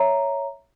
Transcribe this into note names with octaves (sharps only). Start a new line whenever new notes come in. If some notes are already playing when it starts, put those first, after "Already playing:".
Already playing: C#5 E5 A#5